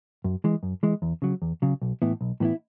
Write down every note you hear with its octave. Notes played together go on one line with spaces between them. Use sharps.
F#2
E3 G#3
F#2
E3 G#3
E2
C#3 F#3
E2
C#3 F#3
B1
A2 E3 B3 E4
B1
A2 E3 B3 E4